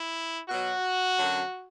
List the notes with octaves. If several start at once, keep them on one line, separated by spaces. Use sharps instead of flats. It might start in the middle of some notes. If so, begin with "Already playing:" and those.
Already playing: E4
B2 F#3 F#4
F#2 D3 F#3